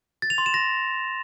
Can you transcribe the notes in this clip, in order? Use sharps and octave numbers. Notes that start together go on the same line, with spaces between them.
A6
F7
C6
E7
A#6